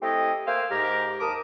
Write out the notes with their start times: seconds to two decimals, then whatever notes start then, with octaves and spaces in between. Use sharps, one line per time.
0.02 A3 C4 E4 G4 D#5
0.46 A#3 C5 E5 F5 G5 G#5
0.71 G#2 G4 A#4
1.20 D#2 A#4 A5 D6 D#6